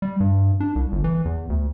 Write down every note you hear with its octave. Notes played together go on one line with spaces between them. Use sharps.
G3
G2
D4
C2
G1
E3
E2
D2